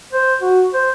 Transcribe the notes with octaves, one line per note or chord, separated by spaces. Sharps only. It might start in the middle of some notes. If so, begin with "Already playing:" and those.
C5
F#4
C5